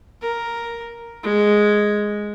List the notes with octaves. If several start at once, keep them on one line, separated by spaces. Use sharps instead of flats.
A#4
G#3